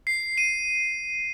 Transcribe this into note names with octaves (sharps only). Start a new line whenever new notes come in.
C7
D#7